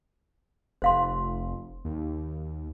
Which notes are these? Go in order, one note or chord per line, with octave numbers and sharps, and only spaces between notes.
F1 C5 F5 C6
D#2